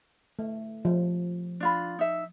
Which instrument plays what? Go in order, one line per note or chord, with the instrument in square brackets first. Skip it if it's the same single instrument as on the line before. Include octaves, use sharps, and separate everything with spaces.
[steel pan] A3
F3
[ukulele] D4 F4 B5
D#4 E5